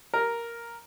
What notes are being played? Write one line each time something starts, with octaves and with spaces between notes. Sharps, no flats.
A#4